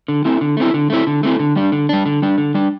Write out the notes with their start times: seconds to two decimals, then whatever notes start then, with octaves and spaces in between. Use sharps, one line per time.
0.08 D3
0.25 A3 C4 E4
0.41 D3
0.57 A3 C4 E4
0.74 D3
0.90 A3 C4 E4
1.07 D3
1.23 A3 C4 E4
1.39 D3
1.56 G3 D4
1.72 D3
1.89 G3 D4
2.06 D3
2.22 G3 D4
2.38 D3
2.54 G3 D4